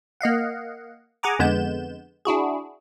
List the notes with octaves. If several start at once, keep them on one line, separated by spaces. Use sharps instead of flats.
A#3 D#5 F5 F#5
G#4 F#5 G#5 A#5 D6
F2 D3 G#3 B3 G6 E7
D4 E4 F#4 G#4